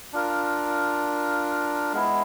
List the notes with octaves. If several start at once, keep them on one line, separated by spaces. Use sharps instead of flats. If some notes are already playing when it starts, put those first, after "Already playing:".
D4 F4 A#4
G#3 B3 E4